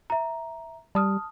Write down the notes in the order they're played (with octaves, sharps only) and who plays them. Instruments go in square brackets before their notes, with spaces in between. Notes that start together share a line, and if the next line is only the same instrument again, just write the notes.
[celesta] E5 A#5
[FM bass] G3 [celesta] A5 D#6 F6